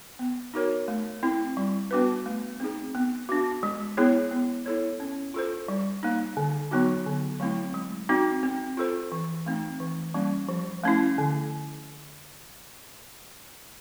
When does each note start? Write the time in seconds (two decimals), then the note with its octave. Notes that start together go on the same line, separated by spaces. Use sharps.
0.19 B3
0.54 D#4 F#4 A#4 C#5
0.88 A3
1.23 C4 E4
1.57 G3
1.91 B3 D4 F#4 B4
2.26 A3
2.60 C4 D#4 G#4
2.95 B3
3.29 D4 F#4
3.63 G#3
3.97 B3 E4 G#4 C#5
4.31 B3
4.66 E4 A4 C#5
5.00 C#4
5.34 F4 A4 C5
5.68 G3
6.03 A#3 D#4
6.37 D3
6.71 F#3 B3 D#4 F#4
7.06 D3
7.40 F#3 A3 C4 E4
7.74 G#3
8.09 C4 D#4 F#4
8.43 C4
8.77 F4 A4 C5
9.12 E3
9.46 A3 C4 D#4
9.80 E3
10.14 G3 A#3 C#4
10.49 F3
10.84 A3 C#4 E4
11.18 D3